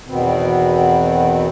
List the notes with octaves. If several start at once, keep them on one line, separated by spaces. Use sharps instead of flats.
E2 B2 D#3 B3 C4